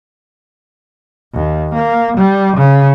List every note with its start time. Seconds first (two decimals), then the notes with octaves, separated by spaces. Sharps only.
1.34 D#2
1.74 A#3
2.17 G3
2.57 C#3